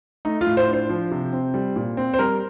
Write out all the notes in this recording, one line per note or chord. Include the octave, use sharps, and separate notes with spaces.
A3 D#4
F4
A2
C5
D4
C5
F3
C3
C4
G3
A#2
C4
C5
G3 A#4